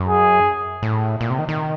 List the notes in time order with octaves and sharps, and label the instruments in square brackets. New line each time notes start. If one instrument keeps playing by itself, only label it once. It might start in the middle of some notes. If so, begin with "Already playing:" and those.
Already playing: [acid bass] F#2
[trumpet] G#4
[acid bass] A2
A#2
C3
D#3
D#3